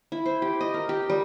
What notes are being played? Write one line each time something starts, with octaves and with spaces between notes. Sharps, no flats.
E4
C5
G4
D#5
A#4
G4
G3